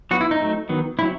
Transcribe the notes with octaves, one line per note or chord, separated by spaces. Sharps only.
F#3 B3 F#4
E4
D#4
F#3 A3 C4
D#3 F#3 B3
F#3 C4 E4